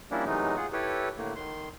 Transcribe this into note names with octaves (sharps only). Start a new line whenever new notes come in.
F3 G3 A#3 C#4 D4 E4
C3 E3 F#3 G#3 A3 D#4
F4 G#4 F#5
E4 G4 A4 B4 C#5
A2 D3 A3 A#3
D#3 C6